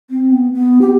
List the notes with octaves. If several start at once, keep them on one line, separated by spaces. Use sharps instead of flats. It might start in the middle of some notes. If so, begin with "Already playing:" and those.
C4
B3
B3
G4